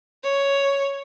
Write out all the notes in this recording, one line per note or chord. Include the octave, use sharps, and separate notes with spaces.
C#5